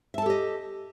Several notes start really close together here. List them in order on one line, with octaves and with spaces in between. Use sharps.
E5 A5 A4 G4 D#5